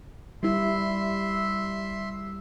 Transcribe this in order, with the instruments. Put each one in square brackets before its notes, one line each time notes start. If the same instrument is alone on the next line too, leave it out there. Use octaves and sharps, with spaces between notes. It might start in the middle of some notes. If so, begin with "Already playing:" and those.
[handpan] G3 E4 [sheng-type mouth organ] E5 C6